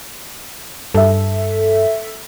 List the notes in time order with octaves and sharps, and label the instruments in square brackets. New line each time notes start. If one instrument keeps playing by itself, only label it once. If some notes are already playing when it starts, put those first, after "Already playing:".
[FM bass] G2 [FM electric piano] A4 E5